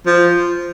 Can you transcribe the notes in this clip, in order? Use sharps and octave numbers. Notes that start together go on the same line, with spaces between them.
F3